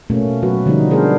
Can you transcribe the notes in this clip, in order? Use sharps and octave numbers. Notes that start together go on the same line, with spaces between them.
B2 A3 A#3 C#4
F#3 F#4 B4
D3 F3 G3 B3 D#4
B3 D4 G#4 A#4 C5